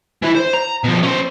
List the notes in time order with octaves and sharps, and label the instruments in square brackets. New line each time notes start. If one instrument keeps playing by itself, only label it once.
[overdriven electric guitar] E3 E4
C5
A#5
B2 F3
C#4 C5